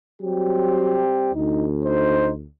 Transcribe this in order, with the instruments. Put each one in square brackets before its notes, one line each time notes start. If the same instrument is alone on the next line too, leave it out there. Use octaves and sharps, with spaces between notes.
[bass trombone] F#3 [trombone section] G3 C4 G4
[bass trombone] D2 [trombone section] D#4
[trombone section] D#4 C5